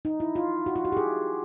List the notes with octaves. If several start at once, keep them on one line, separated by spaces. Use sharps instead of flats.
D#4
E4
F4
F#4
F4
F#4
G4
G#4